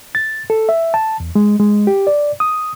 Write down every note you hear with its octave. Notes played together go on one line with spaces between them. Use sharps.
A6
A4
E5
A5
E2
G#3
G#3
G4
D5
D#6